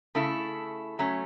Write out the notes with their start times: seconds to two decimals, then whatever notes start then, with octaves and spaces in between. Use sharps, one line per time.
0.15 C#3 A3 E4 A4
0.99 F#3 A3 C#4